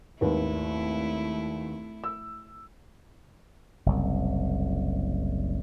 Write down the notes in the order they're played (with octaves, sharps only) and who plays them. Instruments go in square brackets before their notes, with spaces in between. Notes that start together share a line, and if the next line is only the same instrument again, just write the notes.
[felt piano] G#1 D#2 B4 [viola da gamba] A3 E4
[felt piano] E6
[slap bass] F#1 C2